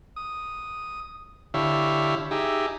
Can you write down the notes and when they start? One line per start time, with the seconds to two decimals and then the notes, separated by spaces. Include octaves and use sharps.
0.16 D#6
1.54 D3 E4 G4 C#5 E5 F5
2.31 D#4 G4 G#4 E5